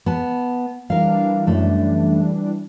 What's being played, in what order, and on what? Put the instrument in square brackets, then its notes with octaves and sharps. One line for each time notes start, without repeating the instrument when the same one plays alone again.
[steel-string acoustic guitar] B3 A5
[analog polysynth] E3 G3 D4 [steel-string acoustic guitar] A#4 F5
[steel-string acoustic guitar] F#2 A3